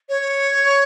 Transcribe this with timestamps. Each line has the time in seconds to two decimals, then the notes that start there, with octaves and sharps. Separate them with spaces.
0.09 C#5